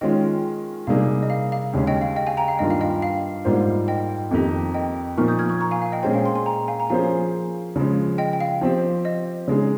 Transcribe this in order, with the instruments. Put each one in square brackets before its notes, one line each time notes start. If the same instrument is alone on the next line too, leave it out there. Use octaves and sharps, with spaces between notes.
[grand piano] D#3 G#3 C#4 F4 [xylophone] D#5 G5
[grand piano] C3 G3 A#3 D#4 G#4 [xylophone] F5
[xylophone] D#5
F5
F5
[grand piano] D#2 C#3 G#3 C#4
[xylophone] D#5 G5
F5
D#5 G5
F5 G#5
G5 A#5
F5
[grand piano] G2 D#3 A#3 F4 [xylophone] D#5
[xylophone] F5
D#5 G5
F5
[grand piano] G#2 G3 A#3 F4 C5
[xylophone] D#5 G5
[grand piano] F2 D#3 A#3 D#4 G4
[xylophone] D#5 G5
[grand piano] A#2 F3 A#3 D#4 A#4 [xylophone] C#6 F6
[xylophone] D#6 G6
F6 G#6
C#6 F6
A#5 C#6
F5 G#5
F5
D#5 G5
[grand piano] A#2 G#3 C#4 G#4 C5 [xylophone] D#5 G5
[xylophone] F5 G#5
G#5 C6
G#5 C6
G5 A#5
F5 G#5
A#5
[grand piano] F3 A#3 C#4 G#4 C5 [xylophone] F5 G#5
[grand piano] C#3 F3 G#3
[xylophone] D#5 G5
G5
F5
[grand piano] F3 C4 G4
[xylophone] D#5
[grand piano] C#3 G#3 D#4 G#4